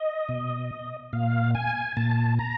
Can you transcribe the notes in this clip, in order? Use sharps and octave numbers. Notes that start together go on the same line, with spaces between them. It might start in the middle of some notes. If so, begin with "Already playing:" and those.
Already playing: D#5
B2
A#2 F5
G#5
A#2 A5
A#5